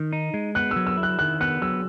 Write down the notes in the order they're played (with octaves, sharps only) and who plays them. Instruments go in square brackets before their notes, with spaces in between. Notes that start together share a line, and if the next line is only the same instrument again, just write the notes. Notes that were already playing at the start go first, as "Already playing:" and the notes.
Already playing: [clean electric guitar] D#3
D#4
G#3
[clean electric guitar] B3 [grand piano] F#6
[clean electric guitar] F#3 [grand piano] E6
[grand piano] E6
[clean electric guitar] E4
[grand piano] F#6
[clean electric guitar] D#3 [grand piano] F#6
[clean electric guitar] B3 [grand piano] F#6
[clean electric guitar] F#3 [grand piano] E6